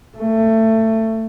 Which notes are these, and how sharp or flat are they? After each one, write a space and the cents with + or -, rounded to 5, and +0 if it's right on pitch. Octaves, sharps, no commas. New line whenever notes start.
A3 +20